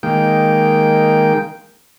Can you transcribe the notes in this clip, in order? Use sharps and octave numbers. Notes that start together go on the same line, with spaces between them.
D#3 G#3 A#3 G5